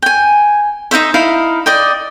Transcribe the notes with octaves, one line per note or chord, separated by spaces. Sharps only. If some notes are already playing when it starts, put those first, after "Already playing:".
G5 G#5
D#4 E4 C5 E5
D#4 E4 F5
D5 D#5 G5